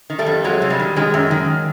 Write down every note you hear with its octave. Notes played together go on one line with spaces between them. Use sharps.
D#3
G3 A3
F2
F2 F#3 G#3
C3
G3
D#3
D#3 F#3 G#3
F#2
D#3